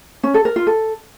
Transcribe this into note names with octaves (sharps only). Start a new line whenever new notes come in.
C#4
A4
A#4
F4
A4